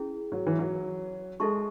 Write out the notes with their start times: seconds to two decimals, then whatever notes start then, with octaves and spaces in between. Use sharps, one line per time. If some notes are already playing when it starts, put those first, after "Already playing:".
Already playing: C#4 E4 G#4
0.32 F#3
0.47 E3
0.59 F#3
1.40 G#3 D#4 A4 E5 A5 C#6